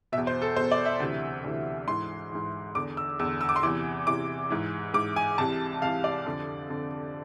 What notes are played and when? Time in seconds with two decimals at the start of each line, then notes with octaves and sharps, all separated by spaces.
0.12 B2 E5
0.17 E2
0.27 C5
0.42 A4
0.56 E2 B2 C5
0.71 D5
0.86 E5
1.00 D2 C3 E3
1.44 D2 C3 E3
1.87 G#2 E3 C6
2.32 G#2 E3
2.75 E2 D3 D6
2.97 E6
3.19 E2 E6
3.23 D3
3.41 E6
3.49 D6
3.56 C6
3.63 E2 C3 E3 D6
4.07 E2 C3 E3 D6
4.50 G#2 E3
4.94 G#2 E3 D6
5.16 G#5
5.38 C2 C3 E3 A5
5.82 C2 C3 E3 F5
6.04 D5
6.26 F2 D3
6.70 F2 D3